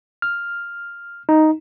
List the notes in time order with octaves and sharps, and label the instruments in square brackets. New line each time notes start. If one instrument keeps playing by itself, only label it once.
[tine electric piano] F6
D#4